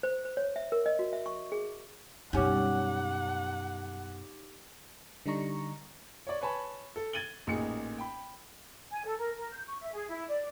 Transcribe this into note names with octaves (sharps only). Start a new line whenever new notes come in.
C5
C5
C#5
E5
A#4
D#5
F#4
E5
C#6
G#4
F#2 B2 G3 C#4 D#4 G4 F#5 D6
D3 G3 D4 D#4 A#5 C#6
C#5 D5
B4 C#5 G#5 A5 B5
A4
G#6 A6 D#7 F#7 G7
A1 A#2 D#4 G#4 C#7
G5 B5
G#5
A4
A#4
A#4
G6
C#6
E5
G#4
E4
D5